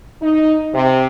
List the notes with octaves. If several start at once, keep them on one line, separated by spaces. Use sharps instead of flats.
D#4
C3